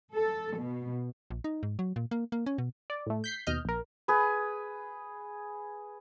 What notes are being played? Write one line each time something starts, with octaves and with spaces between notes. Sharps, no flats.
A4
B2
A#1
D#4
G#2
F#3
A#2
A#3
A#3
C#4
B2
D5
A2 A3
G6 B6 C7
D#2 B2 D#5 F6 G6
A#1 A#4
G#4 B4